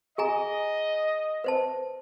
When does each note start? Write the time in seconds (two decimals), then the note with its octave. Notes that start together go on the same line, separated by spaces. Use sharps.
0.18 G#4 D#5 G#5 A#5
1.44 B4 C5 A5